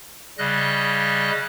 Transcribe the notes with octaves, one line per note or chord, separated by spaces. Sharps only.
C#3 G3 D#5 F#6